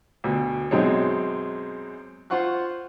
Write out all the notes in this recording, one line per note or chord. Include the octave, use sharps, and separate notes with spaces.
D2 B2
F#2 B2 G#3 C4 D#4 C#5
F4 C5 F#5 C#6 F#6